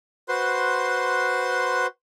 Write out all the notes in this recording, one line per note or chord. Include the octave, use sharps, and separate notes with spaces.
F#4 B4 C5 C6